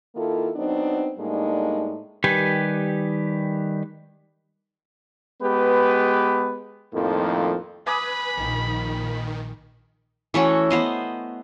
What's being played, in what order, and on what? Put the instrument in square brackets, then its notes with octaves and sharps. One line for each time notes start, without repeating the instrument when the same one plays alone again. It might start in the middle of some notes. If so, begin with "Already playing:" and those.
[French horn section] D#3 A#3 E4 F4 A4
F#3 B3 C4 D4 D#4
A2 G3 G#3 A#3 D4 D#4
[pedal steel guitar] D#3 G3 G4 B4 G#5
[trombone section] G#3 B3 G4 B4
F2 A2 D#3 F3 A#3
[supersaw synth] B4 [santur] G#5 D6 D#6 [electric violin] B5
[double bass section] A#1 A#2 [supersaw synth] D#3
[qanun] E3 A3 C#4 F#4
B3 C5 D#5